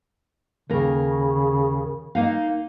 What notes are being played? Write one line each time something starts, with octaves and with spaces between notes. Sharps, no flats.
D#2 C#3 A#4
A#3 D#4 F5